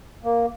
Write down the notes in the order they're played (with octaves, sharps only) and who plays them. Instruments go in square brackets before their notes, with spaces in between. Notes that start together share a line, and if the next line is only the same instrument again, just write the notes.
[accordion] A#3